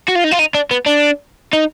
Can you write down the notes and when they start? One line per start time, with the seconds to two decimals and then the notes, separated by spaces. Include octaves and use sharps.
0.08 F#4
0.15 F4
0.24 D#4
0.31 F4
0.39 D#4
0.54 D4
0.71 B3
0.86 D4
1.53 D#4